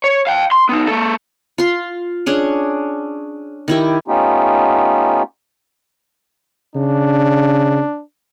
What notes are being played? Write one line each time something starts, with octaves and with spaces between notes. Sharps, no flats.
C#5
F5 G5
C6
B3 D#4
A#3 A4
F4 C6
C#4 D4 G#4
D#3 E4 G4
A3 B3 C#4 D#4 F4 G4
C#3 D4